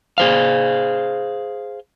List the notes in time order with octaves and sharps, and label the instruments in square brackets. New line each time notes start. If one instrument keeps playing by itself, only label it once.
[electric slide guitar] G#4 C5 F5